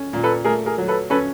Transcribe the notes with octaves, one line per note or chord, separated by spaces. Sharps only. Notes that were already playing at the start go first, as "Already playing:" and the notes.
Already playing: C#4
A#2
A4 B4
A3 G#4 A#4
G#4 A#4
F#3
A4 B4
C#4 A4 B4